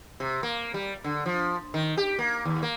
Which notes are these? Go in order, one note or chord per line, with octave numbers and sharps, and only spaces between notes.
C3
A#3
G3
D3
F3
D#3
G4
A#3
D#2
A#3